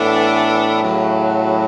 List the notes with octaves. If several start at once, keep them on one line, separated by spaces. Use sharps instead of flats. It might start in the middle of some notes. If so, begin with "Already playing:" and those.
Already playing: A2 E3 B3 D4 A4
E2 C#3 F#3